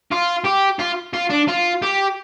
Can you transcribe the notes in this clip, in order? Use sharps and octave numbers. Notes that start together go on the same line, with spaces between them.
F4
G4
F4
F4
D4
F4
G4